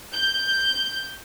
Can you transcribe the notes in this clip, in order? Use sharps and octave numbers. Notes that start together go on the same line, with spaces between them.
G6